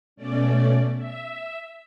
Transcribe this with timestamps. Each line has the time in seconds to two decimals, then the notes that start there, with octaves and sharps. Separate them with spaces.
0.16 B2 A3 C#4 D5
0.97 E5